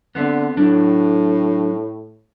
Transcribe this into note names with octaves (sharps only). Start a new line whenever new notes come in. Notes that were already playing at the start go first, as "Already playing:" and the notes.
D3 B3 C4 E5
A2 F#3 D4